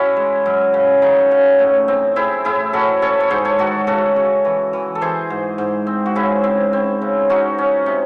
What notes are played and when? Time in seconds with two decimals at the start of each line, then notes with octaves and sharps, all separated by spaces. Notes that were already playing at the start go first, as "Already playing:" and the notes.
Already playing: C#4 E4 F#4
0.16 G#3
0.46 F#2
0.74 C#3
1.02 C#3 D#4
1.31 C#3
1.59 A2
1.88 C4
2.16 C4 E4 G#4
2.45 A2 E4 G#4
2.73 C#4 F#4 A4
3.02 C#4 A4 C#5
3.20 C#5
3.30 G#2 G#4 C5
3.45 A4 C#5
3.59 D#3 F#4 A4
3.87 C#3 F#4 A4
4.16 C#3
4.45 E3
4.73 E3
4.95 A4
5.01 E3 G#4 C5
5.30 G#2
5.58 G#2
5.87 C4
6.06 F#4
6.15 C#3 E4 G#4
6.44 C4
6.73 C4
7.01 C#3
7.29 C#4 D#4 F#4
7.58 C#4
7.86 C3